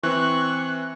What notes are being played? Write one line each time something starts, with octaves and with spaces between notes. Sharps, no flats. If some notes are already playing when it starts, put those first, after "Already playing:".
E3 C4 C#6 F#6